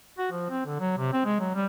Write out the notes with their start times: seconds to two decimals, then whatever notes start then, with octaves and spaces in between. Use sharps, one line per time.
0.18 F#4
0.32 F3
0.49 C4
0.66 D3
0.80 F#3
0.98 C3
1.13 C4
1.25 G#3
1.40 F#3
1.55 G3